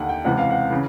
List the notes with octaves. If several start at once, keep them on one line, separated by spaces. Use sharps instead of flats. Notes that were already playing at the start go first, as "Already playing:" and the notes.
Already playing: D#2 D3 F#5
G5
C#2 C3 E3 F#5
F5
F#5
C#3 E3